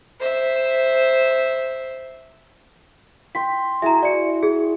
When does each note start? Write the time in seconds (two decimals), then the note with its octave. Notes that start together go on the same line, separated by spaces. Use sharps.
0.20 C5 E5
3.35 G5 C6 B6
3.82 E4 F#4 G#4 E5 A#5
4.03 F#4 D5 C#7
4.43 G#4